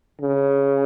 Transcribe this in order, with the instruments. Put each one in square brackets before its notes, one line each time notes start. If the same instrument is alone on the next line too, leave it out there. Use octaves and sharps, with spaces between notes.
[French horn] C#3